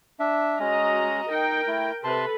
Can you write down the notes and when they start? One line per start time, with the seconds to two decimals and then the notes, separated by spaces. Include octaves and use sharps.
0.20 D4 E5
0.60 G#3 C#4 F#4 D#5 A#5
1.30 D#4 A#4 G5
1.68 A3 E4
2.04 C3 A4 B4 A5 C6